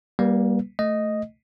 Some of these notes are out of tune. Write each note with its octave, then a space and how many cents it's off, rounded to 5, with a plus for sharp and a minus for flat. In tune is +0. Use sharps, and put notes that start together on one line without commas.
G3 +0 A#3 +30 B4 -10
A3 +0 D#5 +0